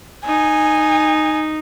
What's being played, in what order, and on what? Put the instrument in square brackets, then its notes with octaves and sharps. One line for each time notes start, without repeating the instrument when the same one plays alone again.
[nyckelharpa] D#4 [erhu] G#5